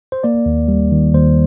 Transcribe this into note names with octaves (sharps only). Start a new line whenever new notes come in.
C5
A#3 D5
D#2
G3
D#3
D#2 C5